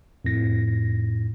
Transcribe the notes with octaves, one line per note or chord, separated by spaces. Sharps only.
F2 A2 A#6